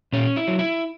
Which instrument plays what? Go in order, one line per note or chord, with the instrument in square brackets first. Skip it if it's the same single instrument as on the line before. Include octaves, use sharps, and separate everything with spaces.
[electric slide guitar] A#2 C#4
E4
F#3
E4